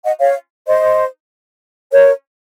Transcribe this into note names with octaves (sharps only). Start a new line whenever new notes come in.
D#5 F#5
C#5 F5
C5 D#5
A#4 C#5